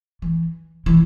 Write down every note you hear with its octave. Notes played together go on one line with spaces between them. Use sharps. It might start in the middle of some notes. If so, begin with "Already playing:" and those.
E3
E3